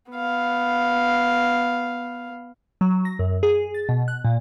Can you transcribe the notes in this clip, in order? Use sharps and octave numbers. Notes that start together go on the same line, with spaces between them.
B3 F5
F#3
A#6
F#2
G#4
A6
B2
F#6
A#2